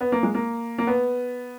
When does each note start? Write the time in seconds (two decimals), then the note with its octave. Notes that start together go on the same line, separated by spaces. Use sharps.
0.01 B3
0.12 A#3
0.23 G#3
0.34 A#3
0.78 A#3
0.87 B3